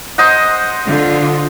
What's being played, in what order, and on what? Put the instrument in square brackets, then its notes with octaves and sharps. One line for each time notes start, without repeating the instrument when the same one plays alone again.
[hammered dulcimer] C5 D#5 F#5
[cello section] D3 F4